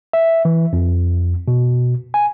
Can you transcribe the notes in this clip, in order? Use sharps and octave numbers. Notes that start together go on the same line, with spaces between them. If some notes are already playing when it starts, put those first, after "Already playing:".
E5
E3
F2
B2
G#5